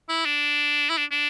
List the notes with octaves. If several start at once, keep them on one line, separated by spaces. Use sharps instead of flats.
E4
D4
E4
D4
D4